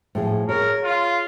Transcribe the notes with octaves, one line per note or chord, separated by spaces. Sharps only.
A2 F3 G#4
G#4 A#4 C#5
F4